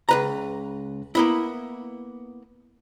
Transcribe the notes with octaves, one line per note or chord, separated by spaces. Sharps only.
C#2 B4 A#5
A#3 B3 E4